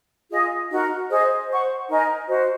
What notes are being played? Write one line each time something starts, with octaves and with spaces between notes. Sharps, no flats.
F4 G#4 D#5
D#4 F#4 A#4
G#4 C5 D#5
C5 F#5 C#6
D#4 A#4 D#5 G#5
F#4 C5 D#5